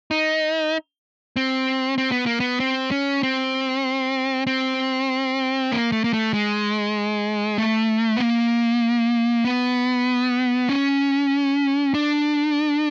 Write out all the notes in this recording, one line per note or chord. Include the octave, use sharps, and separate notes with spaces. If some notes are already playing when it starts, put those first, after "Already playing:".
D#4
C4
C4
B3
A#3
B3
C4
C#4
C4
C4
A#3
A3
A#3
A3
G#3
A3
B3
A#3
B3
C#4
D4